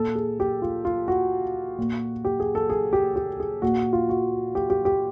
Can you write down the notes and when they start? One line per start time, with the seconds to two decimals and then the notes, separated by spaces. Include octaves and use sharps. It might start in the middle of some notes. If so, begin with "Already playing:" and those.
Already playing: A#2 A4
0.15 G#4
0.40 G4
0.62 F4
0.85 F4
1.08 F#4
1.78 A#2
2.25 G4
2.40 G#4
2.55 A4
2.70 G#4
2.93 G4
3.16 G4
3.40 G#4
3.62 A#2 F#4
3.93 F4
4.09 F#4
4.55 G4
4.70 G4
4.85 G4